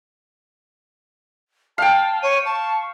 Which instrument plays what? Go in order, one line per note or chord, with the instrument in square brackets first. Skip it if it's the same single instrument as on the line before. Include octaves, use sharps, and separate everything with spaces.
[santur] F5 G5 [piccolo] A5
[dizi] C#5 [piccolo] D#7
[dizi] A5 [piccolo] C#6